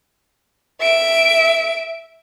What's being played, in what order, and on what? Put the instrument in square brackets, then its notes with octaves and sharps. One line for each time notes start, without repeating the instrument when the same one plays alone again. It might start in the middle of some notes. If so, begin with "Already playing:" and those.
[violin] E5 D7